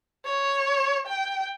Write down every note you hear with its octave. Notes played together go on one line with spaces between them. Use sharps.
C#5
G5